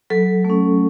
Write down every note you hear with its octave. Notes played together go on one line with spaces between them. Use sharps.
F#3 A4
A3
C#4